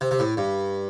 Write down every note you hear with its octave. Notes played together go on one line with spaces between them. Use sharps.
C3
C3
A2
G2